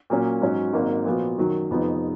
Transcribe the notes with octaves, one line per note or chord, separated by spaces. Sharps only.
A#2 F#3 A#3 C#4
G#2 F#3 C#4 F#4
G#1 G#2 F#3 A#3
A#2 F3 B3 F#4
F#2 D#3 F#3
F1 F2 F3 B3 D#4